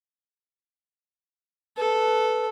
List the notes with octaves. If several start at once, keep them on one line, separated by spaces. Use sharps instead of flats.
A4 B4